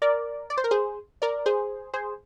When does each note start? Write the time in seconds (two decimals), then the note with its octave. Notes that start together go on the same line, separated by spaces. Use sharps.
0.02 A#4 D5
0.50 D5
0.57 C5
0.64 A#4
0.71 G#4 C5
1.22 A#4 D5
1.46 G#4 C5
1.94 G#4 C5